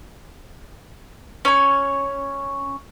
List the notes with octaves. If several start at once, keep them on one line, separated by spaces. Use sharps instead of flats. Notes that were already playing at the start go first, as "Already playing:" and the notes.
C#4 C#5